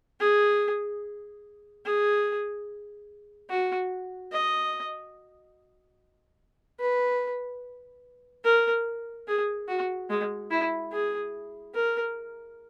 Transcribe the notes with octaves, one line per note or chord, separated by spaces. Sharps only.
G#4
G#4
F#4
D#5
B4
A#4
G#4
F#4
G#3
E4
G#4
A#4